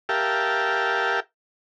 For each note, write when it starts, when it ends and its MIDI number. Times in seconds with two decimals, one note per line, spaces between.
0.09 1.20 67
0.09 1.20 70
0.09 1.20 76
0.09 1.20 77
0.09 1.20 79
0.09 1.20 81